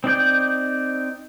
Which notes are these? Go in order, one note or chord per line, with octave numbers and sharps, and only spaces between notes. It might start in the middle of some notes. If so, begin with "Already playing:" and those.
C4 D#4 D5 G6